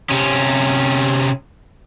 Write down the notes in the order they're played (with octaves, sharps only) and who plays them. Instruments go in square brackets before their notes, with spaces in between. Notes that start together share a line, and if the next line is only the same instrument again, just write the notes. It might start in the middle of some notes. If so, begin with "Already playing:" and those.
[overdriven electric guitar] C3 C#4